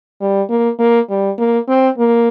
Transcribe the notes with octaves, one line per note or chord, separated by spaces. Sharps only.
G3
A#3
A#3
G3
A#3
C4
A#3